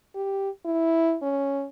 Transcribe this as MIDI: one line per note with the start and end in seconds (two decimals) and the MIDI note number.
0.15 0.50 67
0.65 1.16 64
1.22 1.66 61